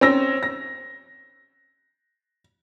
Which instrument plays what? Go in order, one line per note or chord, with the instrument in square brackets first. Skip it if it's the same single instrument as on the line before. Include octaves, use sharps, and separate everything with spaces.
[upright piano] C4 C#4 E6 A#6
A#6